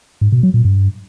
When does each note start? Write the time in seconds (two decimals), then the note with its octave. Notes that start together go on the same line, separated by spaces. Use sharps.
0.21 G#2
0.32 B2
0.43 F#3
0.54 A#2
0.65 G2